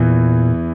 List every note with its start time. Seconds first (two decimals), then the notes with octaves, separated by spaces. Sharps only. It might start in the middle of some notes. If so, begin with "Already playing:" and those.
Already playing: E2 A#2 E3